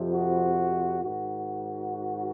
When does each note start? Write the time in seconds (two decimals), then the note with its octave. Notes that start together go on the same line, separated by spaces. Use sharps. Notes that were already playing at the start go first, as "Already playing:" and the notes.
Already playing: F2 C3 F3
0.12 F#4
1.03 G#2 D#3 F#4